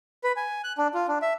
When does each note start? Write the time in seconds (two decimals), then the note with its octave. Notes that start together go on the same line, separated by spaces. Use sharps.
0.24 B4
0.36 G#5
0.64 F#6
0.78 D4
0.94 F4
1.08 D4
1.22 E5